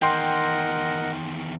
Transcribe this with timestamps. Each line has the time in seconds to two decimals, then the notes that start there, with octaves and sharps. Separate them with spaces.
0.02 E2 D#3 A#4 D#5 F#5 G5 C6